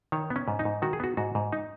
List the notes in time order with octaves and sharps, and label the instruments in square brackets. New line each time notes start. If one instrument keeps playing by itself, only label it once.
[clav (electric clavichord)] D#3 C#5
B3
C#4
G#2
D#4
G#2
D#3 F#4
G#4
B3 F#4
G#2 F#4
G#2
D#4